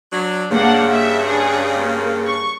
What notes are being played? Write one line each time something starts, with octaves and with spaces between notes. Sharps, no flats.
F#3 D4
G2 C#3 A#3 D4 F#5
E5
D4 G#4
A#3
C#6